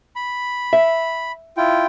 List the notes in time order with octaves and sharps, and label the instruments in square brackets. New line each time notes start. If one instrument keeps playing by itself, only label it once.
[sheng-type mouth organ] B5
[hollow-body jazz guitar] E5
[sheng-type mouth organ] E4 F4 G5